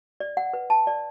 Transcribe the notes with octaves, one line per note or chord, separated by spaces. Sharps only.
D5
F#5
B4
A5
D5